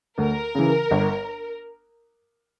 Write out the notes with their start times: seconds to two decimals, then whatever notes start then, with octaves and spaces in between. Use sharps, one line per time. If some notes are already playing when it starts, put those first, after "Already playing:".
0.18 D2 A#4
0.55 C#3 E3
0.91 G1